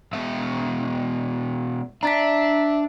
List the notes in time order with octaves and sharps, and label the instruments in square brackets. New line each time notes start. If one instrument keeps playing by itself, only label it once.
[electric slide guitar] B2 G#3 E5
[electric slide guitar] D4 [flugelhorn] E5 [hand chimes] A#5 A6 B6